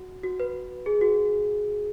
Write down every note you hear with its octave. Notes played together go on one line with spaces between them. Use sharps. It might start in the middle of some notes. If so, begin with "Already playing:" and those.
Already playing: F#4
F#4
B4
G#4
F#4